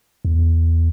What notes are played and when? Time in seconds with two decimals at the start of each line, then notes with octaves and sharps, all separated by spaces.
0.25 E2